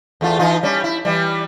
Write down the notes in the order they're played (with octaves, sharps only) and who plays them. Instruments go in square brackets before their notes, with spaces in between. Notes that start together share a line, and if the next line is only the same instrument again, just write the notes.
[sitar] E2 A3 F4
E3 D#4 F4
G3 C#4
E4
E3 G3